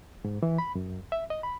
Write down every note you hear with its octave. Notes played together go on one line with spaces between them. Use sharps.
G#2
E3
B5
F#2
E5
D#5
B5